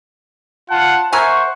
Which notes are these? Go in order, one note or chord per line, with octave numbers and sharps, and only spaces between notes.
F4 F#5 A5
A#4 C5 E5 F#5 G#5 C#6